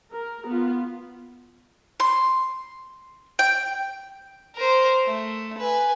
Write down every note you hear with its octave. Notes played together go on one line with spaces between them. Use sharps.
A#4
B3 F4
C6
G5
A#4 C5
A3
B4 G#5